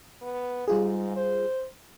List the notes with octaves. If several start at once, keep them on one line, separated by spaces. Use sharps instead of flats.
B3
G#2 G3 F4 G#4
C5